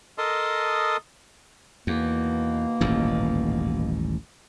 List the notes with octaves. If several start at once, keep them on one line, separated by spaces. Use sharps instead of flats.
A4 A#4 D#5 A5 C6 D#6
E2 B2 D#3 A#3
D#1 A1 G#2